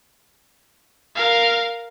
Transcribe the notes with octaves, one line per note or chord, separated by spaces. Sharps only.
A#4 F5